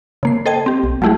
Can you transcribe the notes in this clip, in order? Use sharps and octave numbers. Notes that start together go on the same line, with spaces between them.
C#3 A#3 C7
A4 C5 D#5 G5 A5 G#6
C4 G4
B1
F#3 G3 A3 E4 G4 G#4